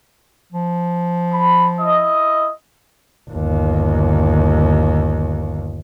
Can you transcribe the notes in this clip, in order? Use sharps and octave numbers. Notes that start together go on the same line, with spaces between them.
F3
B5
E4 D#5
G1 D#2